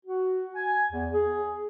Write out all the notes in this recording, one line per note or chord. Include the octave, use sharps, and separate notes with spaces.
F#4
G#5
E2
G#4